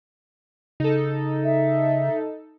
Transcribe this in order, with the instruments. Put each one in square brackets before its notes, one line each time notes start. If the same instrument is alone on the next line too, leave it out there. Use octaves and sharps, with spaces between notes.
[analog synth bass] C#3 [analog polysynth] D#4 A4
[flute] E5